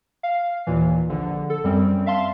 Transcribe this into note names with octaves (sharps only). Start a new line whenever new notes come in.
F5
D#2 A#2 E3
A#1 D3
A4
F#2 G3 C4
E5 F5 A5 C6